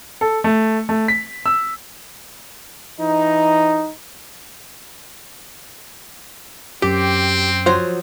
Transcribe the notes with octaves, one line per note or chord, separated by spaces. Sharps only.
A4
A3
A3
B6
E6
E3 D#4
F#2 C4 G4 D6 B6
F3 F#3 C5